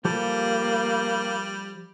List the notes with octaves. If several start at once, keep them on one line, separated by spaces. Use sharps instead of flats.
F3 G3 A#3 G4 A4